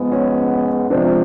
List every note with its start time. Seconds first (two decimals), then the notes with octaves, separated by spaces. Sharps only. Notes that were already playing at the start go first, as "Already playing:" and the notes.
Already playing: G#2 F3 G#3 B3
0.12 C#4
0.90 C3 F3 G#3 C4 D4